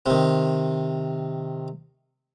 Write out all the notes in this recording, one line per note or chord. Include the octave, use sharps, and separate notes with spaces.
C3 D#3